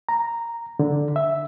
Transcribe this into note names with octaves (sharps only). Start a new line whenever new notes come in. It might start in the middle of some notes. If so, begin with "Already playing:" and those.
A#5
D3
E5